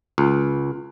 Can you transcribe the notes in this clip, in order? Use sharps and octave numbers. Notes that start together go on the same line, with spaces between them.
C#2